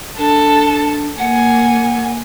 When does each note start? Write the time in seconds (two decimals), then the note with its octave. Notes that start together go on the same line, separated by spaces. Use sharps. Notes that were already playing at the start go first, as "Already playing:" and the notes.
0.18 D4 A4 A5
1.19 A#3 F#5 G#5